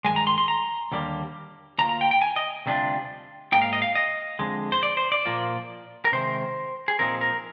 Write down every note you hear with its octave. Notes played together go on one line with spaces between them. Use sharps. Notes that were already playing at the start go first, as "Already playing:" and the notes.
G2 D#3 G#3 G#5
A#5
C6
C6
A#5
D#2 D3 G3 A#3
D2 C3 F3 A#3 F4 A#5
A#5
G5
G5
G#5
D#5
D2 C3 G3 D4 F4
G#2 D#3 A#3 D#4 G5
F5
D#5
F5
D#5
F2 D3 G#3
C5
D5
C5
D5
A#2 F3 A#3 F4
A#4
C3 D#3 G#3 C5
G#4
A#2 F3 C4 D#4 A#4
A#4